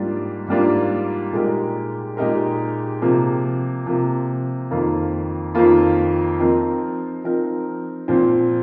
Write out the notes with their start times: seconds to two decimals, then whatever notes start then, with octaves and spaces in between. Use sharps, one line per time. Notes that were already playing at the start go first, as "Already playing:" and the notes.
Already playing: G#2 G3 A#3 D4 F4
0.48 G#2 G3 A#3 D4 F4
1.33 A#2 G#3 D#4 G4 A#4
2.17 A#2 G#3 D#4 G4 A#4
3.02 C3 F3 A#3
3.86 C3 F3 A#3
4.71 F2 D#3 A#3 F4
5.55 F2 D#3 A#3 F4
6.40 F3 C4 D#4 A#4
7.25 F3 C4 D#4 A#4
8.08 A#2 F3 C4